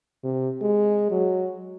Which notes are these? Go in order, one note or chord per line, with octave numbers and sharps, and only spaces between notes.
C3
G#3
F#3